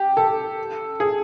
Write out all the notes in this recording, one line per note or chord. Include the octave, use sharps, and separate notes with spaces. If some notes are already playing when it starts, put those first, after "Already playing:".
Already playing: G4
A4
G#4